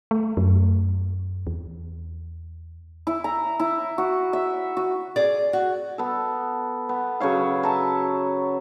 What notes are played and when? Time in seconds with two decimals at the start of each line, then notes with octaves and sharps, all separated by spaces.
0.11 A3
0.37 F#2
1.47 E2
3.07 E4
3.24 A#5
3.59 E4
3.98 F#4
4.33 E5
4.77 F#4
5.16 G#4 D5
5.53 F#4
5.98 B3 A4
6.89 B3
7.20 C#3 F#3 C#5 F5
7.63 E5 A5 A#5